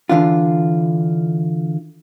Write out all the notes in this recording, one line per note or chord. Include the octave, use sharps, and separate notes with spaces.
D3 E3 D4 F4